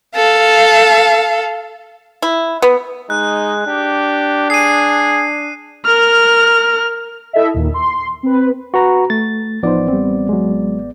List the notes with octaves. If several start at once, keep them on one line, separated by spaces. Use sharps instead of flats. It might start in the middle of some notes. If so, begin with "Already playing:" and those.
A4 F5
E4
B3
G#3 D#4 F#6
D4 G4
G#4 C7 D#7
A#4 F6
E4 A4 D#5 E5
D#2 A#2
C6
C4 B4
F#4 B4 A#5
A3 A6
A1 F3 B3 D#4 C5 D5
G3 C4
F#3 G#3